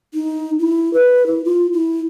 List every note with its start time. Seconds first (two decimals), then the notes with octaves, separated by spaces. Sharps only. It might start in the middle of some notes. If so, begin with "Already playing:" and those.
0.14 D#4
0.59 E4
0.94 B4
1.26 E4
1.45 F4
1.73 E4